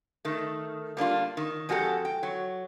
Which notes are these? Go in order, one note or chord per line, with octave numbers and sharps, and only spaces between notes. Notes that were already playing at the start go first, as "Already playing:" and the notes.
D#3 A3
G3 A#3 D4 F4
D#3
F2 G#3 F#4 G4 A4
G5
F#3